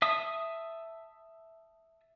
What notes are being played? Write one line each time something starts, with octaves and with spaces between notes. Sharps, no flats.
E5 A5 D#6